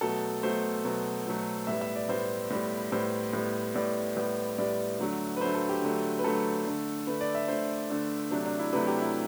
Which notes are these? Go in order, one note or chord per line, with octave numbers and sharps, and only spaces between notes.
B2 F#3 A3 A4
B2 F#3 A3 C5
B2 F#3 A3
B2 F#3 A3
A2 G3 B3 E5
E5
D5
A2 G3 B3 C5
A2 G3 B3
A2 G3 B3 C5
A2 G3 B3
A2 G3 B3 D5
A2 G3 B3
A2 G3 B3 D5
D3 F#3 A3
B4
D3 F#3 A3 C5
A4
G4
D3 F#3 A3
B4
D3 F#3 A3 A4
D3 A3
D3 A3 B4
D5
E5
D3 A3 C5
D3 A3
C3 F#3 A3 D4
D4
E4
C3 F#3 A3 B4
G4
E4